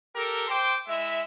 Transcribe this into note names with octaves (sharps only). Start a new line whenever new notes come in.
G4 A4 A#4
C5 G5 C6 D6
G#3 E4 E5